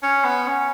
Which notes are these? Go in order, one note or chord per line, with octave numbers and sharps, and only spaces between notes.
C#4
B3
C#4